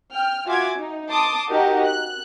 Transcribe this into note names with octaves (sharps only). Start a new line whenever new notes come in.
G5 F6
F4 F#4 E5 G#5 D6 G#6
D#4
A5 C6 D6 D#6
D#4 F#4 G4 A#4 D#5
F#6